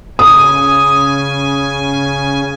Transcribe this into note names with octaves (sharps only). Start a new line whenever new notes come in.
C#3 G#5 D#6